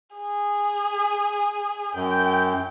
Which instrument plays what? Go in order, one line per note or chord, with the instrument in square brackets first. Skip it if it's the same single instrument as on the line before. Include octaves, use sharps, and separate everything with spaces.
[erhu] G#4
[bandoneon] F#2 [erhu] G5